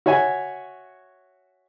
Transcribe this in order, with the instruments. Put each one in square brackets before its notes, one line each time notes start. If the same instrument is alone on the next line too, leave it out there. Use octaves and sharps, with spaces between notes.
[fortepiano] F#4 C#5 E5 G#5